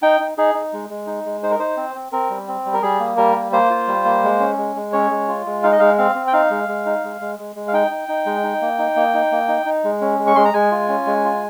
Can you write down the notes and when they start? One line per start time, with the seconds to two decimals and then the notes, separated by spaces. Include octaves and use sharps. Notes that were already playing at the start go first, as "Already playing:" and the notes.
0.02 D#4 G5
0.20 D#4
0.38 D#4 G#4
0.54 D#4
0.73 G#3
0.90 G#3
1.07 D#4
1.25 G#3
1.43 D#4 C5
1.51 A#4
1.59 D#4 C5
1.77 C4
1.95 C4
2.12 C4 A#4
2.30 G3
2.48 C4
2.66 G3
2.73 A#4
2.82 G3 G#4
3.00 A#3
3.17 G3 A#4
3.36 A#3
3.52 A#3 C5
3.70 F4
3.88 G3
4.05 A#3
4.24 G#3
4.40 C#4
4.57 G#3
4.76 G#3
4.92 C#4 C#5
5.11 G#3
5.28 F4
5.46 G#3
5.63 D#4 F5
5.72 D#5
5.80 G#3 F5
5.98 C4 F5
6.15 C4
6.27 G5
6.33 D#4 F5
6.51 G#3
6.69 G#3
6.86 D#4
7.04 G#3
7.21 G#3
7.39 G#3
7.56 G#3
7.68 F5
7.73 D#4 G5
7.91 D#4
8.09 D#4
8.26 G#3
8.43 D#4
8.62 A#3
8.79 D#4
8.96 A#3
9.14 D#4
9.32 A#3
9.48 D#4
9.66 D#4
9.84 G#3
10.01 C#4
10.19 G#3
10.27 C#6
10.35 G#3 C6
10.45 A#5
10.54 G#3 G#5
10.72 F4
10.89 C#4
11.07 G#3
11.24 F4